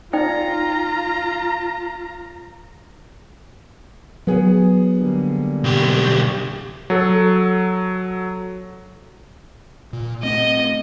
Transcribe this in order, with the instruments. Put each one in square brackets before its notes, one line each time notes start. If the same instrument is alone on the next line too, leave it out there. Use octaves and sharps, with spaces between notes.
[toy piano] D#4 D5 G5 [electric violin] F4 A#5
[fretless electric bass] F#3 [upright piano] B3 G#4
[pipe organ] D3 G3 A#3
[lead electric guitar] B1 G4
[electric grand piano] F#3 A4
[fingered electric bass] A#2
[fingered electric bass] A3 C4 [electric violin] D#5